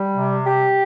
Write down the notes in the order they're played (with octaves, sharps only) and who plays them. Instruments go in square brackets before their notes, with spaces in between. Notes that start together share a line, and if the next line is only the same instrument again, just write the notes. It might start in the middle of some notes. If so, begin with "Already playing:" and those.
Already playing: [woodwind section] G3
C3
G4